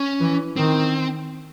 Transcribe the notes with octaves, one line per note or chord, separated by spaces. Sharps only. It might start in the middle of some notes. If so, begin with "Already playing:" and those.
Already playing: C#4
E3
D#3 C4